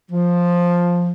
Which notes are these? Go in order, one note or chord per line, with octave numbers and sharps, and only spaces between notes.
F3